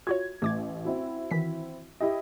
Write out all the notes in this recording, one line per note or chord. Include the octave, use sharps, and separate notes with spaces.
F4 F#4 C#5 G#6
A1 A3 D6 G#6
C4 E4 F#4
D#3 E3 B6
E4 G4 D#5